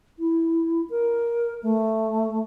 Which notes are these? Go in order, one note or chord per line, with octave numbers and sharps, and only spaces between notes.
E4
A#4
A3